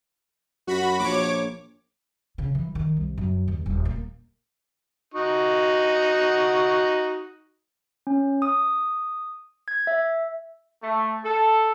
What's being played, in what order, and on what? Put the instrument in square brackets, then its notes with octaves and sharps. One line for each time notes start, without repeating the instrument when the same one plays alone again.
[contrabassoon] F#2 [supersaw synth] F#4 B5
[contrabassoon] A#1 [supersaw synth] C#5 D6
[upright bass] C#3
E3
D#3
C2
F#2
D#2
D#1
A#3
[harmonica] D#4 F#4 C#6
[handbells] C#4
D#6
G#6
E5
[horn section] A3
A4